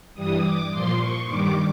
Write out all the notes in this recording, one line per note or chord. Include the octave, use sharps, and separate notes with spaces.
G2 E3 G3 D#6
D6
A#2 F3 C6
C#6
G2 D#3 G3 D6